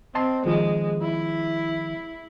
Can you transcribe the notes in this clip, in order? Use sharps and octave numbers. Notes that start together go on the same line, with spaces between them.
C4 D#5 A5 C6
D#3 F3 G#3
E4